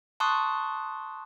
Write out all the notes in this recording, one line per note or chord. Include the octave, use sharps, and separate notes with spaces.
A5 C6 C#6 D#6 F#6